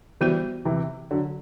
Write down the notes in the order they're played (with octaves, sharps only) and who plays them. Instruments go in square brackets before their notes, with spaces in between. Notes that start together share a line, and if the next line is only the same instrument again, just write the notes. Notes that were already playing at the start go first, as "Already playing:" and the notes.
[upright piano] E3 G3 [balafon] B3 F#4 C5
[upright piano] C3 E3
D3 F#3